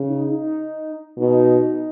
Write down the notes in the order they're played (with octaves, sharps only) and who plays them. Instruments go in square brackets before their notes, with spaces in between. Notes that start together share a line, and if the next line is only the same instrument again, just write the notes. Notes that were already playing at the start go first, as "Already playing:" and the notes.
Already playing: [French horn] C#3
[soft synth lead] D#4
D#4
[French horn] B2 [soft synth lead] D#4